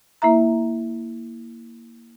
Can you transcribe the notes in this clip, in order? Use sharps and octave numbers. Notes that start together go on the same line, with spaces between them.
A#3 E4 E5 A#5